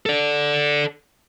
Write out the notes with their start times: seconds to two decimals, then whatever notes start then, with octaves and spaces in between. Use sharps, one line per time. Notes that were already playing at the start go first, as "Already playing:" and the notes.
0.06 A4 D5